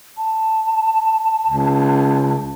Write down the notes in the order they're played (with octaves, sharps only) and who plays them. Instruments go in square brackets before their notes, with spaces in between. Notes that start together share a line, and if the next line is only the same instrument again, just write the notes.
[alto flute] A5
[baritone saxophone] C#2